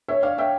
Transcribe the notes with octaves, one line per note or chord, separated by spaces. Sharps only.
C#5 E5
D5 F5
E5 G5